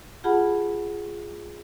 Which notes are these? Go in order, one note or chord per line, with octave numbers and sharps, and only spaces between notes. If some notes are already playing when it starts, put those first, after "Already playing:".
F4 G4 G#4 F#5 A5 B5